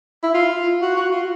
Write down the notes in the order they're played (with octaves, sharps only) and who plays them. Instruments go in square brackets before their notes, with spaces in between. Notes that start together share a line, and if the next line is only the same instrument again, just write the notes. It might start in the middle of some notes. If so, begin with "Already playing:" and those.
[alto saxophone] E4
F4
F#4
F#4
F4